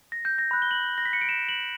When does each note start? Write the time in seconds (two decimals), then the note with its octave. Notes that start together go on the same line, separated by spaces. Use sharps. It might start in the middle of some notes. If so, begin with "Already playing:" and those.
0.12 A#6
0.25 G6
0.38 A#6
0.51 B5 F#6
0.62 G7
0.71 F#7
0.98 A#6
1.05 B6
1.13 C#7
1.21 D7
1.29 E7
1.49 F#7